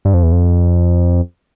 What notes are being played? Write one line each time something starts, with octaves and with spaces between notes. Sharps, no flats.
G2
F2
E2
F2